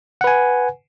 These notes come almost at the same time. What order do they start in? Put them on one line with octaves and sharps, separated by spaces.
F#5 B4 G#5